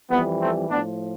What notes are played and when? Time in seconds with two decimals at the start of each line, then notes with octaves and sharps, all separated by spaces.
0.11 F2 E3 G3 B3
0.40 A3 C4
0.70 A2 F3 B3 D4